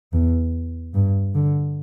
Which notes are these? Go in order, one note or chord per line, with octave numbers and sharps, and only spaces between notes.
E2
G2
D3